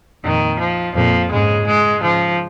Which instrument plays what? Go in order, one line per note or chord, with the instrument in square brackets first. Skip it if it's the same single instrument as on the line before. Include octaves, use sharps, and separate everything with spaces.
[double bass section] F2 A#2 [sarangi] D#3
[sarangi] F3
[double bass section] F2 A#2 [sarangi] F3
[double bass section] G#2 C#3 [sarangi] G#3
[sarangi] G#3
[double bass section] G#2 C#3 [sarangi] F3